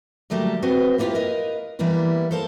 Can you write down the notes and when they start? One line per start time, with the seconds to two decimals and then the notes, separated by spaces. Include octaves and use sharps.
0.30 D3 F#3 G3 A3 A#3 G4
0.62 B3 C4 F#4 G#4 B4 C5
0.98 A3 A#3 D4 E4 F4 G4
1.15 A#4 B4 D#5 F5
1.79 E3 G3 A#3 B3 E4
2.31 A4 A#4 C5 F5 A5